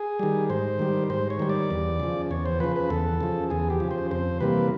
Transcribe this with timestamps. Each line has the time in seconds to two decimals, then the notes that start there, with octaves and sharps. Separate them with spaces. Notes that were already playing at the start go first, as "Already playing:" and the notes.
Already playing: G#4
0.19 D#3 G3
0.50 G#2 C5
0.79 D#3 G3
1.10 G#2 C5
1.30 C#5
1.39 D#3 G3
1.50 D5
1.71 E2
2.00 C#3 F3
2.31 E2 C#5
2.46 C5
2.60 C#3 F3 B4
2.76 B4
2.90 E2 A4
3.21 C#3 F3
3.50 E2 G#4
3.70 G4
3.80 C#3 F3
3.91 C5
4.11 F2 C5
4.40 C3 E3 G3 A#3 B4